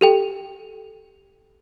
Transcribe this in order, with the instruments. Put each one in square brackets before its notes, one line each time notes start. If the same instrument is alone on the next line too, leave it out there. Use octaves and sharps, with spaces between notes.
[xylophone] G4 A4 G5